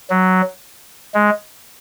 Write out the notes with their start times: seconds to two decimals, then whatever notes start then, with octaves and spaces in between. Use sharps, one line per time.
0.10 F#3
1.14 G#3